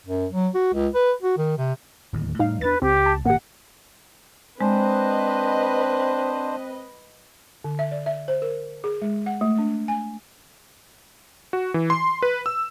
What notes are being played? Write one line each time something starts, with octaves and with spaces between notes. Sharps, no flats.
F#2
F#3
F#4
C#2
B4
F#4
D#3
C3
D1 D#2 A2
A2 G3 D#4 F5
E2 G3 D4 B4 A6
C#2 C4 G4
A5
G#1 A#2 A#3 G4 F#5
G#3 C4 D4 B4 C5 D#5
D3
E5
D5
E5
C5
A#4
G#4
G#3
F#5
A3
D4
G#5
F#4
E3
C6
B4
E6